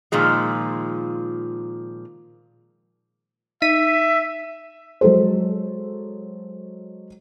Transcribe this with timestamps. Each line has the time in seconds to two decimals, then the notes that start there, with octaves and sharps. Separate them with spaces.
0.12 A#2 D#3 F3 G#3
3.62 D#4 E5 B6 D#7
5.01 F#3 G#3 A4 C5